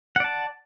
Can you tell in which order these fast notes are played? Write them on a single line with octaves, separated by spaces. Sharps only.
F#5 D5 A5